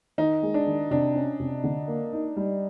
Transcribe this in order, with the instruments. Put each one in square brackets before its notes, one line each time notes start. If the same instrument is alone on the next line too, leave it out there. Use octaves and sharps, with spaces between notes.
[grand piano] D#3 [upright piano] D#4
[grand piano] G#3
[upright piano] D4
[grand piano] D#3
[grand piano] C3 [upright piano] D4
[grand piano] C#4
C3
D3
A#3
D#4
G3